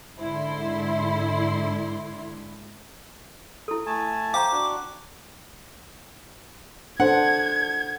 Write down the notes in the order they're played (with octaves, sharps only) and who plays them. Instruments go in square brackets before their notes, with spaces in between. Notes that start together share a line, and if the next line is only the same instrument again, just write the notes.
[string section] G#2 D3 E4 C6
[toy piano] E4 A4
[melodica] A3 G#5 A5
[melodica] C5 [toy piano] F5 G5 A#5 [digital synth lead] D6
[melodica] D4 F#4
[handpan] D4 A4 C5 [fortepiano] F#5 [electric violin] G#6